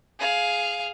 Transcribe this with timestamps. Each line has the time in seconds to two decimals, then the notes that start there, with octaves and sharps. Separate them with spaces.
0.19 G#4 F5